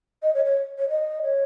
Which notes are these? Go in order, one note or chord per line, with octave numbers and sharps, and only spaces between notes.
D#5
C#5
C#5
C#5
D#5
C#5